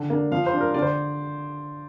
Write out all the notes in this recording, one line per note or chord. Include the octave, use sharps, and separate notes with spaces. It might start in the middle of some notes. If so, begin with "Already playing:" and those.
Already playing: D3
A#3 D4
F3 F5
C5
D4
A#4
D3 D5
C5